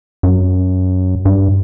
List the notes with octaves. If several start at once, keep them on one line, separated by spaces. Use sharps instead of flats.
F#2
G2